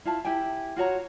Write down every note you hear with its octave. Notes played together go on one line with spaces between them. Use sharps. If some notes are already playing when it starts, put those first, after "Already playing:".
E4 F4 F5 A5
E4 G4 G5 G#5
F4 F#4 C#5 A#5